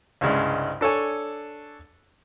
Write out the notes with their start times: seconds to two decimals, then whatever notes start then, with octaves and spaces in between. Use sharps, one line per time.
0.21 C2 G2 C#3 G#3
0.81 D4 A4 C#5 G#5